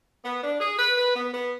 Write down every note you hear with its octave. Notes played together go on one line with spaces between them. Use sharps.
B3
D4
G#4
B4
B4
B3
B3